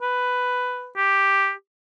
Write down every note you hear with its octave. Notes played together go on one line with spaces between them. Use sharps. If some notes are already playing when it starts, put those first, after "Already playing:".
B4
G4